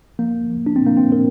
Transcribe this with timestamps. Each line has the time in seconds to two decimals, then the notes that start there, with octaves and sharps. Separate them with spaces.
0.19 F3 A#3
0.50 F3
0.66 D4
0.76 C4
0.82 A#2 A#3
0.97 C4
1.12 A#2 A#4